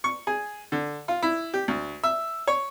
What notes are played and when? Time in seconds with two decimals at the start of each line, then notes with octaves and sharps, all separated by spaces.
0.04 C#6
0.27 G#4
0.72 D3
1.08 F4
1.22 E4
1.54 G4
1.68 D2
2.04 E5
2.47 C#5